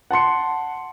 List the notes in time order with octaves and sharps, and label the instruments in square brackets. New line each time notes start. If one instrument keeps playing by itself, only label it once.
[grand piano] F#5 A5 C6 C#7